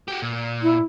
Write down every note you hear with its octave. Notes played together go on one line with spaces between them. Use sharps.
F#4 G4
A#2
E4